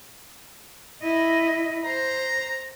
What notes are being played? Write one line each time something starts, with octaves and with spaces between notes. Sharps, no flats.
E4 D#5
C5 A#5